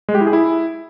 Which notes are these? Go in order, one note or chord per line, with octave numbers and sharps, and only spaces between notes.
G#3
G4
E4
G#4
E4